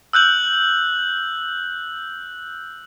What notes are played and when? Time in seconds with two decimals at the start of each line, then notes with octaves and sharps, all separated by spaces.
0.13 E6 F#6 G6 F#7